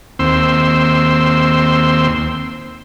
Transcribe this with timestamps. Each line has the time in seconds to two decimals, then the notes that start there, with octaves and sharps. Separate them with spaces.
0.19 D#2 C4 C6 E6